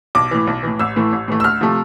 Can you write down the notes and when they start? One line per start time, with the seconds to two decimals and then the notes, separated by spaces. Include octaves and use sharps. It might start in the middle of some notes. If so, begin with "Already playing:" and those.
0.15 B1 D6
0.31 A2 E3
0.47 B1
0.63 A2 E3
0.79 A1 E6
0.96 A2 E3 A3
1.12 A1
1.28 A2 E3 A3
1.40 E6
1.44 D2 F6
1.61 C3 F3 A3